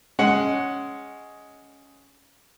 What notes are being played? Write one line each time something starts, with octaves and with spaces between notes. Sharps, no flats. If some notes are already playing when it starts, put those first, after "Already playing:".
G#3 C#4 F#5